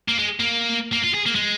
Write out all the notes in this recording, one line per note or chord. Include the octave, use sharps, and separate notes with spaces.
A#3
G#3
A#3
A#3
F4
G#4
A#3
G#3